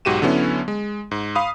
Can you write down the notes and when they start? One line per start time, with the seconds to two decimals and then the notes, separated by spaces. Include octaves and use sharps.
0.05 B1 G#2 F#4 G4 D#7 E7
0.22 D3 F#3 B3 C#4 E4
0.68 G#3
1.11 G#2
1.35 F5 B5 D#6